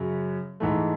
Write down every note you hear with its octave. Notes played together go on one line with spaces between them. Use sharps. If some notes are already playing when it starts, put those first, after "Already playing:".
Already playing: F#2 C#3 F#3
G#2 E3 A3